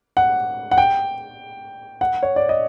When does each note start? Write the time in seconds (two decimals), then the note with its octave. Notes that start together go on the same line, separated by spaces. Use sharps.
0.17 F#5
0.71 F#5
0.78 G5
2.01 F#5
2.23 C#5
2.36 D5
2.49 D#5